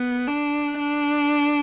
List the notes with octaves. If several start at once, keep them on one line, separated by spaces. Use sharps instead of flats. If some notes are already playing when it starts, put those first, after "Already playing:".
Already playing: B3
D4
D4